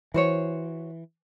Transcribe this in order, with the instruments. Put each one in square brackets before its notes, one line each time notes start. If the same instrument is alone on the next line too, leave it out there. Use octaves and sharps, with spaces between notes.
[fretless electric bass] E3 [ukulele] F#4 C5 C#5